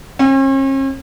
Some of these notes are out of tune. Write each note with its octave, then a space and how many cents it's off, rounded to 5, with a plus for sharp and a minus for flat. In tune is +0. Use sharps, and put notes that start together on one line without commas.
C#4 -45